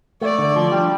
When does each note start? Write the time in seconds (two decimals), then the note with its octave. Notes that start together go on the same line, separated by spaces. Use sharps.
0.21 A3 D5
0.38 D3
0.56 F3
0.72 G3